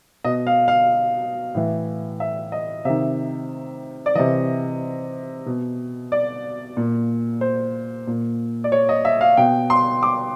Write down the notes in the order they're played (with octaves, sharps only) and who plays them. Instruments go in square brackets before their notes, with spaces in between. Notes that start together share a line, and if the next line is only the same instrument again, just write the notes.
[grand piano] B2 D#5
F5
F5
A2 E3
E5
D#5
C3 D#3 E5
D5
C3 E3 D#5
B2
D5
A#2
C5
A#2
D5
C#5
D#5
E5
F5
B2 G5
C6
D6